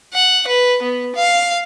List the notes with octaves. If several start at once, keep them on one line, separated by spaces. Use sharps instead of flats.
F#5
B4
B3
F5